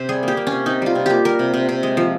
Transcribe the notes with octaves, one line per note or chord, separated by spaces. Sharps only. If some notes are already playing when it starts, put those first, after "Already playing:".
Already playing: C3 C5
G3 G#4
A#3 G4
A#3
C#4
C3
C3 D#4
G3 F4
C3
A#3 G4
G3 A#4
C3
C3
C3
G#3
F3